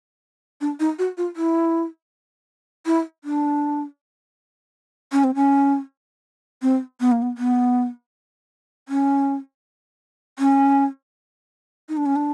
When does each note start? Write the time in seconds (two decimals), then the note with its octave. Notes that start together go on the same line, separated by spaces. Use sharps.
0.61 D4
0.80 D#4
0.99 F#4
1.18 F4
1.36 E4
2.86 E4
3.24 D4
5.12 C#4
5.24 C4
5.35 C#4
6.62 C4
7.00 B3
7.12 A#3
7.22 B3
7.38 B3
8.89 C#4
10.39 C#4
11.89 D#4
11.97 D4
12.06 C#4
12.16 D4